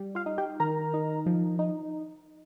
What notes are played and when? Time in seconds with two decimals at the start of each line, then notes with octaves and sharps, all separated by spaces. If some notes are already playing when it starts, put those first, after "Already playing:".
Already playing: G3
0.15 F4 F5
0.26 D#4
0.38 G4 G5
0.60 D#3 A#4 A#5
0.94 D#4
1.26 F3
1.59 D#4